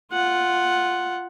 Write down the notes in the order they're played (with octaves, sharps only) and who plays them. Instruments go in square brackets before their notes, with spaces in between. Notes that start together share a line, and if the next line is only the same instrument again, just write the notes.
[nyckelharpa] F4 F#5